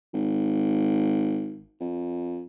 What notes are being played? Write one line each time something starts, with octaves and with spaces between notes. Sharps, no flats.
G#1
F2